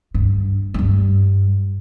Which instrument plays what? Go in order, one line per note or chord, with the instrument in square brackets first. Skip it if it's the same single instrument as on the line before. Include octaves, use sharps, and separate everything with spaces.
[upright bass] G2
G2 G3